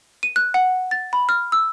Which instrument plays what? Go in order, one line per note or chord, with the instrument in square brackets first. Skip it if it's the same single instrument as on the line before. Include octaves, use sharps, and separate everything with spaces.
[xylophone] D#7
F#6
F#5
A6
B5
F6
E6